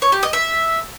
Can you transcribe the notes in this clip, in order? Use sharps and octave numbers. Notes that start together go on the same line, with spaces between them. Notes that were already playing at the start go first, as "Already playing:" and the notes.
C#5
G4
D#5
E5